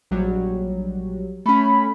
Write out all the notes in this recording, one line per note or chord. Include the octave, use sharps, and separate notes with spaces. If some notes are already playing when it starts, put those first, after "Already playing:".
A#1 F#3 G3
A3 C#4 B5